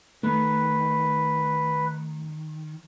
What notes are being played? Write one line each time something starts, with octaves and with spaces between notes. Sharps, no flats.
D#3 A3 B4